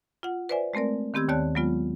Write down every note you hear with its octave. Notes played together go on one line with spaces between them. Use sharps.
F4 F#5
B4 C5 D5 E5 G#5
G#3 A3 C4 A#4 D5
D#3 B3 C4 G4 E6 G#6
D#2 D#3 C#5 D5 A5 F#6
F#3 G#3 B3 F4